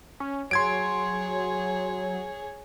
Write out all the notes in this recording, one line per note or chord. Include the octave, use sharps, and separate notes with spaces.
C#4
F#3 G#4 C#5 C6 G#6 D7